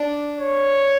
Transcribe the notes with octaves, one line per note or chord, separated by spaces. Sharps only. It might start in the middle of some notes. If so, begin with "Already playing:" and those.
Already playing: D4
C#5